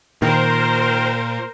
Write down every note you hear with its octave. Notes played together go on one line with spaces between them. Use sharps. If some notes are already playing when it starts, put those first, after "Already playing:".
A#2 D#3 F4 A#4 C5